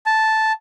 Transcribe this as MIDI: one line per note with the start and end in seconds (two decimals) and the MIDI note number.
0.06 0.52 81